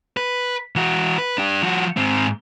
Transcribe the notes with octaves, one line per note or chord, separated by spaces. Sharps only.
B4
E3 F#4
B4
D4 G4
F3 F#4
G#2 C4